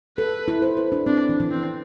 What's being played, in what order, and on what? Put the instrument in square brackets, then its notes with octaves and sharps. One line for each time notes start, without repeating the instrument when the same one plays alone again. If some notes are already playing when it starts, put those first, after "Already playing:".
[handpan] A4 [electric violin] B4
[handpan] E4
C5
B4
D4
[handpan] C4 [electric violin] D4
[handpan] E3
E3
[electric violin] C4